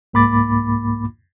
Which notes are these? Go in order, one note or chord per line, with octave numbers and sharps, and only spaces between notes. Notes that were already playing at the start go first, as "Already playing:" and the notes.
C2 G#2 A#3 B5 D6 A6